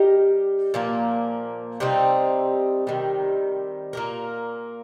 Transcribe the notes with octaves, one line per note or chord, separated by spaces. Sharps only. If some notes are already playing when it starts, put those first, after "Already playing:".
Already playing: G3 D#4 G4 A#4
A#2 F3 A#3
C3 G3 C4 D#4
C3 D#3 G3
A#2 A#3 G4 A#4